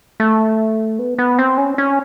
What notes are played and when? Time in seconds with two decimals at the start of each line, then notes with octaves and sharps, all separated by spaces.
0.20 A3
0.99 B3
1.18 B3
1.39 C4
1.58 C#4
1.78 C#4